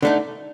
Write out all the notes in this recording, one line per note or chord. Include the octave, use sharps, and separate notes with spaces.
D3 A3 D#4